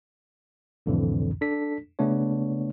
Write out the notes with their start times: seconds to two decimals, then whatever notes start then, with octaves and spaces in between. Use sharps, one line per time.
0.86 C2 F2 A2 D3 E3
1.41 D4 A4 B6
1.99 C#3 A3 B3 D4 C#5